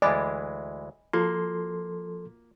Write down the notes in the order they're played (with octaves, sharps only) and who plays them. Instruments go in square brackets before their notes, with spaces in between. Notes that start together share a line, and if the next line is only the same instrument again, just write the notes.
[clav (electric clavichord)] D2 E3 G#3 [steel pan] D5 [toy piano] D#5 G#5 B5
[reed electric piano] F3 A4 C6 [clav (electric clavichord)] A#3 [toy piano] F4 F#4